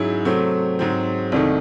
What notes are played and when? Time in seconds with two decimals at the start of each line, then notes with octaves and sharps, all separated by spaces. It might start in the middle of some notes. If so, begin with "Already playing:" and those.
Already playing: G#2 F#3 C#4 E4 G#4
0.25 C3 F#3 A3 C4
0.79 G#2 F#3 C4
1.32 C2 C3 D#3 A3 D#4